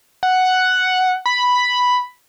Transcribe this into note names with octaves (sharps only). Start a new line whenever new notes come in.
F#5
B5